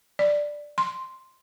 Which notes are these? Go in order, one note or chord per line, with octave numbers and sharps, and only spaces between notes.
D5
C6